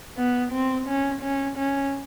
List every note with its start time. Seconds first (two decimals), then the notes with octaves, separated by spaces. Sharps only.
0.17 B3
0.52 C4
0.87 C#4
1.22 C#4
1.57 C#4